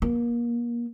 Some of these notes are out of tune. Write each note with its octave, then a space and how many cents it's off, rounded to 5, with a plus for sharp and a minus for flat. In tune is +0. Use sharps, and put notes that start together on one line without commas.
A#3 +30